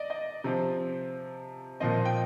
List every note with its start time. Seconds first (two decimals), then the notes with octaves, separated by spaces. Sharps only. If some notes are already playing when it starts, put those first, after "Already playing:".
Already playing: D5 D#5
0.10 D#5
0.44 C3 F3 C4
1.80 A#2 F3 C4 D#5
2.05 G5